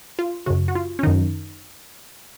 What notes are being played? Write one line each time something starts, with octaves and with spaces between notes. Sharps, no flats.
F4
F#2 C#3 F#4
F#4
F4
C#4
F#2 D#3 D#4